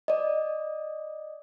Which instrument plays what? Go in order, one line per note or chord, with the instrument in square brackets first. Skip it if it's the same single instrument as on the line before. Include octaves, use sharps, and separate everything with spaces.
[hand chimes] D5 D#5